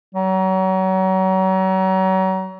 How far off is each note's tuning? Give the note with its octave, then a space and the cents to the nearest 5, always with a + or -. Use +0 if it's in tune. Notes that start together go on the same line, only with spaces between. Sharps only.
F#3 +35